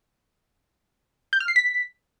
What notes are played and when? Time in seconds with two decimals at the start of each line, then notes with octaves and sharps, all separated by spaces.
1.33 G6
1.40 F6
1.48 C7
1.56 B6